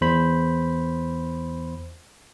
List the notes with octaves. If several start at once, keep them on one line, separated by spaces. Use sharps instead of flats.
E2 C5 B5